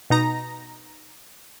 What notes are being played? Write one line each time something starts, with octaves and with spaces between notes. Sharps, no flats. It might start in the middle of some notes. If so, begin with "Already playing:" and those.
B2 D#4 A#5 A#6